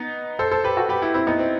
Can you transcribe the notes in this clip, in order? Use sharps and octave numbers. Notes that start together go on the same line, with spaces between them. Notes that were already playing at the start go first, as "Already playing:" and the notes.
Already playing: B3 D#4
A4 C5
A4 C5
G4 B4
F#4 A4
G4 B4
E4 G4
C4 E4
B3 D#4
C4